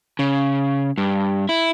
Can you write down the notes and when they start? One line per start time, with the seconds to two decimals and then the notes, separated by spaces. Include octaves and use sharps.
0.19 C#3
0.98 G2
1.49 E4